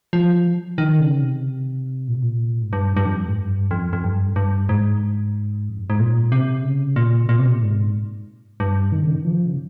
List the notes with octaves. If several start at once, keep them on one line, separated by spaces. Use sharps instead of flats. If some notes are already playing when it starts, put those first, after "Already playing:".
F3
D#3
C#3
C3
A#2
C3
A#2
G#2
G2
G2
F2
G#2
G2
F2
F2
G2
G2
G#2
F2
G2
G#2
A#2
C3
C#3
A#2
A#2
C3
A#2
G#2
G2
D#3
C#3
D#3
F3
C#3